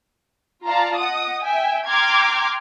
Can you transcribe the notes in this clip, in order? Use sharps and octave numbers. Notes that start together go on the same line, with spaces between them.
F4 D5 F5 A5 A#5
D#5 F#5 D#6
E5 G5 G#5
G5 A#5 C6 D6 F6 G#6